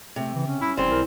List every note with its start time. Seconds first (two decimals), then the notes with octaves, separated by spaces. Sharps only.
0.16 C3 A3
0.34 C#3 E3
0.47 C#4
0.61 G2 E4
0.77 F1 E3 G3 C4
0.90 B1 A#4